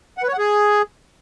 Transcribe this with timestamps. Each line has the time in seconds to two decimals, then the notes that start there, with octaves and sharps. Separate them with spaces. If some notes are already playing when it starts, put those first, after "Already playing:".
0.18 F#5
0.23 B4
0.28 C#5
0.33 F#5
0.38 G#4